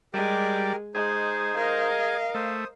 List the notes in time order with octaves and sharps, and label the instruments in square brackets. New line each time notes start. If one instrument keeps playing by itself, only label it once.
[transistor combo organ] G3 D5 [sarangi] G#3 [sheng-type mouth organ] G4 A#4
[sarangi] G#3 [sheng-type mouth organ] D#4 C5 [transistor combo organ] G#4
[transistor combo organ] G#4 [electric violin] A#4 D#5 [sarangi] F5
[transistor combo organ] A3 [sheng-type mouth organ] C5 D#6